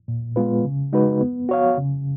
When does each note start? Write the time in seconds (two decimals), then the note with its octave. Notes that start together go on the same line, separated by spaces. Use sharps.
0.08 A#2
0.36 G#3 B3 F4 B4
0.65 C#3
0.93 G#3 D#4 F#4 B4
1.21 B3
1.49 F#4 C#5 F5
1.77 C#3